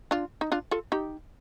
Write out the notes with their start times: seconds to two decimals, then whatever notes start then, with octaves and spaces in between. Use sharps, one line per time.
0.11 D4 F4
0.41 D#4
0.52 D4 F4
0.71 F4 A4
0.92 D#4 G4